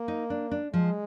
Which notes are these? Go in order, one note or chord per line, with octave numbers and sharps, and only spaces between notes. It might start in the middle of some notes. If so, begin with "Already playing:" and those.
Already playing: A#3
D#4
D4
D4
F3 G#3